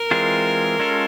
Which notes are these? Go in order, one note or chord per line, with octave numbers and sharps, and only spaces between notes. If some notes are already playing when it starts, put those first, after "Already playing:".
Already playing: A#4
E3 G#3 C4 F4 G#4
G#3 C#4 F4 A4